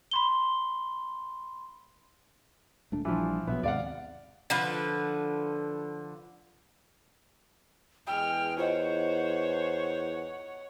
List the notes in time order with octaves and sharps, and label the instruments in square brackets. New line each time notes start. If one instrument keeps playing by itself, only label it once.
[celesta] B5 C6 G7
[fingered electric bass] D#1 A3 D4
[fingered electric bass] A#1 G3 D4 [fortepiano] E3 F3
[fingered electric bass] A#1 B2 F#3 [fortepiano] B3 E5
[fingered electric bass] D#2 G#2 C3 [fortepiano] D5 F5 F#5
[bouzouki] D3 F3 B4
[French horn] E2 [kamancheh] G#3 F6 [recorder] G5
[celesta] F4 D#5 [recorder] C5 [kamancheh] C#5 F#5